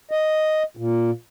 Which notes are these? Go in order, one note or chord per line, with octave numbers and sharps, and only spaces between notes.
D#5
A#2